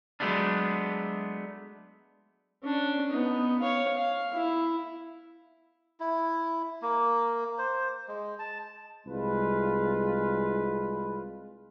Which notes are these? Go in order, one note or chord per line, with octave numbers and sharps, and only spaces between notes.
F#3 G#3 A3 B3 D4
C#4 D4
B3 D#4
C#5 F5
F5
E4
E4
A#3
C5
G#3
A5
C2 G#3 F4 B4